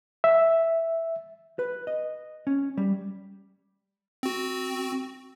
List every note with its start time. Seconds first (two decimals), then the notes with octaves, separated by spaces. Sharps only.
0.24 E5
1.59 B4
1.87 D#5
2.47 C#4
2.77 G3
4.23 C4 F#4